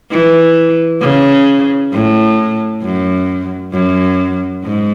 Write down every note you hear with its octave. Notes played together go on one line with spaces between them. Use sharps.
E3
C#3
A2
F#2
F#2
G#2